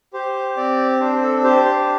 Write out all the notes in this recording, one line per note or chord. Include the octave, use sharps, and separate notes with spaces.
G4 C5
C4 D5
D4 C5
A4
G4 C5
C5